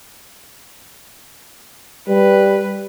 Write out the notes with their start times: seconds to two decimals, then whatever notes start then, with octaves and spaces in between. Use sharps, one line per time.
2.08 G3 B4